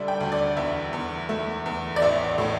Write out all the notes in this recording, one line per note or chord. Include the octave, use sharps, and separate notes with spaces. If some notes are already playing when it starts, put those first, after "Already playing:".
Already playing: D2 D3 G3 D5 E5
G5
D2
D5
E2 E5
E2
A3 E5
E2
D5
A1 E5
A2